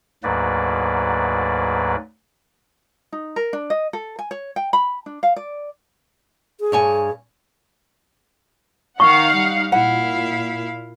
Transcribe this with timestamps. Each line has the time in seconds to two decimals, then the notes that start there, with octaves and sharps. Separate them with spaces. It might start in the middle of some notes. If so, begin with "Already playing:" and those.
0.24 D2 G#2 F#3 A#3 B4 D5
3.12 D#4
3.36 A#4
3.53 D4
3.70 D#5
3.93 A4
4.19 G#5
4.31 C#5
4.56 G5
4.73 B5
5.06 D4
5.23 F5
5.36 D5
6.60 G#4
6.72 G2 C#5 G#5
9.00 D#3 D#4 F5 F#5 C#6
9.34 G3
9.72 A#2 E4 F5 F#5